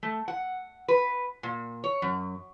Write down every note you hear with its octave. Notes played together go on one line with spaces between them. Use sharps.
A3
F#5
B4
A#2
C#5
F#2